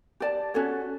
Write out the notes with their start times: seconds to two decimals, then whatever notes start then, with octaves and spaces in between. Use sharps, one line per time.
0.20 G4 D5 A5
0.54 C#4 F#4 A4 C#5